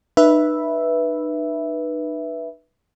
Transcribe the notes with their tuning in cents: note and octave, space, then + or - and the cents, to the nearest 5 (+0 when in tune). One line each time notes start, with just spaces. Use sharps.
D#4 -40 B4 -10 E5 +0